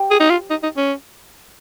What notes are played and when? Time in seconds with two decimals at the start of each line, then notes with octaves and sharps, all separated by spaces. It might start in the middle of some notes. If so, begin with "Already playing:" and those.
Already playing: G4 C5 G5
0.11 G#4
0.20 D#4
0.30 F4
0.50 D#4
0.63 D#4
0.77 C#4